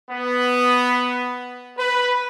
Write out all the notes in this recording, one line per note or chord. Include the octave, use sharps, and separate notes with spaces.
B3
B4